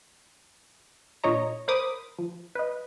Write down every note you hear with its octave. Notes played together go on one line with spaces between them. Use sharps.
A#2 D4 C#5 D#5 A#5
A#4 C5 B5 D6 D#6
F3
B4 D#5